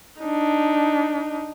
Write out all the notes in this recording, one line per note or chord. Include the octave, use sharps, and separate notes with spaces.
D4 D#4